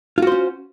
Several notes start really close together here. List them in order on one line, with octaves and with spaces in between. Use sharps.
F4 F#4 C5 C#4